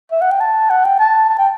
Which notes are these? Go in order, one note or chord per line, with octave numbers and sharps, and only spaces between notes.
E5
F#5
G5
A5
F#5
G5
A5
A5
G5